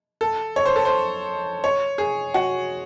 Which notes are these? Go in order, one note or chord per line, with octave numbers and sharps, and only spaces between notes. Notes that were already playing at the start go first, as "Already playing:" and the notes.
A4
C#5
C5
A4
C5
C#5
G#4
F#4